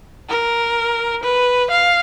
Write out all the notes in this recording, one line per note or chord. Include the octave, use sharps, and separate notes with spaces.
A#4
B4
F5